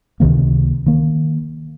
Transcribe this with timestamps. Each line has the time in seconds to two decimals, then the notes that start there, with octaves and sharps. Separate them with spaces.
0.20 C#2 C3 D#3 A#3
0.86 D#3 A#3